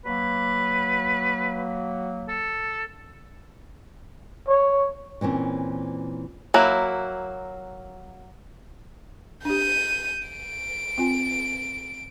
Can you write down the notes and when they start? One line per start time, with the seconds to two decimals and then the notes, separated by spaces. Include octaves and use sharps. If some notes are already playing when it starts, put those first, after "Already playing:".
0.05 F#3 A#3 B4
2.28 A4
4.48 C#5
5.21 A#2 E3 C4 C#4
6.54 F#3 A#3 E4
9.45 D4 G4 G6 D#7
10.28 D7
10.98 C4 F4 G#5